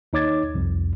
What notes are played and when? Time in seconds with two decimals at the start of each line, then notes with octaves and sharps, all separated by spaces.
0.13 D#2 D#4 C#5 D6 G#6 A6
0.55 C2 F2